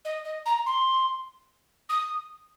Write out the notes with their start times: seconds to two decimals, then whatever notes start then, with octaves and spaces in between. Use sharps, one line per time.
0.05 D#5
0.25 D#5
0.46 A#5
0.66 C6
1.89 D#6